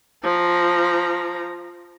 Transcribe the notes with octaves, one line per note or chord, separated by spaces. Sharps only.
F3 A#5